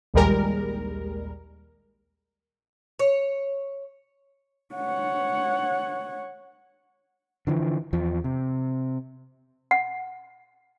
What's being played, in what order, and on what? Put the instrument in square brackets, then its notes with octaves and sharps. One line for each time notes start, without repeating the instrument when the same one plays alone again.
[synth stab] A#1 D#2 G3 G#3 A#4
[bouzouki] C#5
[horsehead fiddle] C#5 F#5
[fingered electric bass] D3 E3 F3
E2 F3
C3
[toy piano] F#5